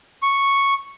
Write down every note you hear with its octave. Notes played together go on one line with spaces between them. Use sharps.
C#6